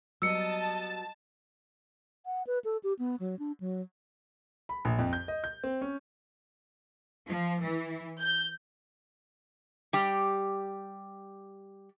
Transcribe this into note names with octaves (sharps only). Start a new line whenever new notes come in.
F#3 G3 B3 D#5 A5 E6 C#7
F#5
B4
A4
G4
B3
F#3
D4
F#3
B5
A#1
F2
G6
D#5
G6
C4
C#4
F3
E3
G6
G3 G4